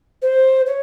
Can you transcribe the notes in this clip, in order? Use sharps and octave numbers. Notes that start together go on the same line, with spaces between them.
C5
C#5